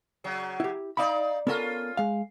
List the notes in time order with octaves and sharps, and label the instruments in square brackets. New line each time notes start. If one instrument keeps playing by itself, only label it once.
[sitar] C#3 F#3
[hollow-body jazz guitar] E4 G4
[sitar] D#4 D5 [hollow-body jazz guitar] F5 B5
[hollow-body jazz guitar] B3 A4 A#4 [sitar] C#4 F4
[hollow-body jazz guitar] G#3 F5